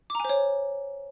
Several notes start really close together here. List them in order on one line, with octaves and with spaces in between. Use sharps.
D6 A#5 G#5 C5 C#5